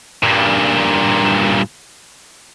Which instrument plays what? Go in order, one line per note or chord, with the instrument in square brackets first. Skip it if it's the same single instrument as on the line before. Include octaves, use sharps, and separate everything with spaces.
[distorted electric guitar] G2 A#2